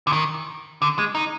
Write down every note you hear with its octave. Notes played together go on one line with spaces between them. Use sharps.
D3
D#3
D3
G#3
D#4